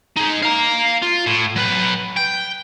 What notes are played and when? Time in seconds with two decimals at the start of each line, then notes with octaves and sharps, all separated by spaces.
0.16 G#3 D#4
0.43 F5 A#5
1.02 F4
1.26 A2
1.56 F#3 B4
2.16 G5